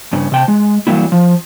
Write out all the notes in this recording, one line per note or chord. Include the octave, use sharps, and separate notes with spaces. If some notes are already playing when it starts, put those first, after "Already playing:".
G2 C#3
C3 G5 A5
G#3
E3 F#3 G3 A#3 E4
F3